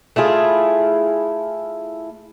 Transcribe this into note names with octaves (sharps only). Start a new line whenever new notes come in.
A3 E4 F4 G#4